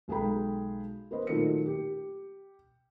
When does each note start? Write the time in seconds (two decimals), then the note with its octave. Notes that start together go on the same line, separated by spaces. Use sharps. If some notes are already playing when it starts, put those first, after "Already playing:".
0.08 B1 G#3 G#4 A4 G5 B5
1.11 A#3 B4 C5 D#5
1.27 A#2 D#3 F#3 A3 A#4 C#7
1.66 G4